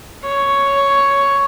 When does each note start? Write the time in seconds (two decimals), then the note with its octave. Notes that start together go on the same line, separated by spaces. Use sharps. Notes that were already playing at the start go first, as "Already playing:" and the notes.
0.24 C#5